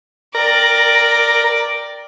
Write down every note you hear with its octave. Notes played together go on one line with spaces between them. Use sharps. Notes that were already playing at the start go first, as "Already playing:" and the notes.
A#4 D5 G5